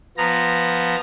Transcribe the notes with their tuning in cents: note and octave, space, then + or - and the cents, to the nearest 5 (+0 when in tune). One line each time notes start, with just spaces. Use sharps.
F3 -5 B3 +0 A#5 -5